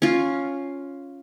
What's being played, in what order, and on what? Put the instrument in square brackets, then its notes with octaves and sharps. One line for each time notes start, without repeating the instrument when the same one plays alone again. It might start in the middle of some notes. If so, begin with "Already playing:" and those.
[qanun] C#4 F4